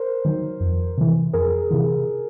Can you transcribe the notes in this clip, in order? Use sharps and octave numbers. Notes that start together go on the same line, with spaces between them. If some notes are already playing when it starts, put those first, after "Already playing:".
Already playing: A#4 C5
D#3 F#3
F2
C3 E3
F2 G#4 A#4
C3 E3